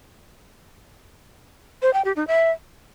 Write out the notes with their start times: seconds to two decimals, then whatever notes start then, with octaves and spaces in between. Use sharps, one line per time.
1.82 C5
1.93 G5
2.05 G4
2.16 D#4
2.27 E5